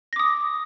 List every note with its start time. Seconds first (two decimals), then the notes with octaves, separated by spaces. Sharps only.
0.13 A#6
0.16 D6
0.19 D#6